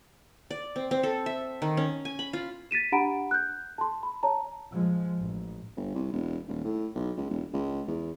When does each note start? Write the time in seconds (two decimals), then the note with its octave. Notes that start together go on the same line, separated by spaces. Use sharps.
0.51 D5
0.76 C4
0.91 C4
1.03 A4
1.26 E5
1.62 D#3
1.77 C#4
2.05 G#5
2.19 B5
2.33 F4
2.71 A6 B6 D#7 E7
2.92 D4 G4 F#5 A#5 B5 D7
3.31 F#6 G6
3.78 A5 C6
4.03 B5
4.23 C#5 A5 A#5
4.71 F3 G#3
5.18 A1
5.77 G1
5.95 C2
6.13 E1
6.48 D#1
6.65 A2
6.95 B1
7.17 C#2
7.30 E1
7.53 C#2
7.87 E2